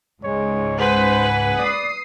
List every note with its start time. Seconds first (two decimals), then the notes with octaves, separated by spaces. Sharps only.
0.24 C#2 G#2 G#3 C#5
0.80 B4 C5 F#5 G#5
1.58 D5 D#6 C7